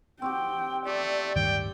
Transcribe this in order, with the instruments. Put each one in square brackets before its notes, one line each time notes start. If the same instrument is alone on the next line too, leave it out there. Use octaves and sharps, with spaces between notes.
[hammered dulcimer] C4 F#4 G4 [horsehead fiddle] G5
[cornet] A3 [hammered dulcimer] G4 [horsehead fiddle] D5
[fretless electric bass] D1 G2 D#3 [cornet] G5